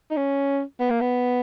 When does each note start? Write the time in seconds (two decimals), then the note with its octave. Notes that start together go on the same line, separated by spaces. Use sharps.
0.11 D#4
0.17 C#4
0.80 B3
0.90 A#3
1.01 B3